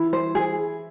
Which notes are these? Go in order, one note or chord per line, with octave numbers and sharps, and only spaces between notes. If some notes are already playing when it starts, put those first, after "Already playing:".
Already playing: E3 E4
C5
G#4